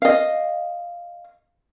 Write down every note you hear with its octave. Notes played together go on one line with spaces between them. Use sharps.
D#5 F5